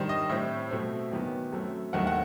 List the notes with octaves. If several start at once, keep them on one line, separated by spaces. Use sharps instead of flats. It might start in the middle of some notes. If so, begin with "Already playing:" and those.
Already playing: G2 D#3 G3 C5
D#5
A2 G3 C4 E5
B2 A3 C4
E2 D#3 F#3 B3
F#2 F#3 A3 C4
D#2 D#3 A3 C4 F#5
F#5